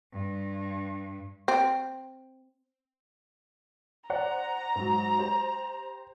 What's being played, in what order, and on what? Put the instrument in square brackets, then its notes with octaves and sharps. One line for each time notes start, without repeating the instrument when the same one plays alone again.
[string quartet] G2
[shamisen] C4
[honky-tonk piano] C5 D5 F#5 [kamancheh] A#5
[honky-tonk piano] G#2 F#3
G4 C5